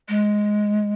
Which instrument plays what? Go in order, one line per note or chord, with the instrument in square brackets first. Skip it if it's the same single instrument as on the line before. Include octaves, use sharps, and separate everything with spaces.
[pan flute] G#3